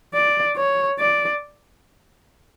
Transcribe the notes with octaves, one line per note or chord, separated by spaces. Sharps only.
D5
C#5
D5